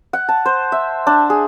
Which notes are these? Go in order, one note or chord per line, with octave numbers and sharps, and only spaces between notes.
F#5
A5
C5
E5
D4
G#4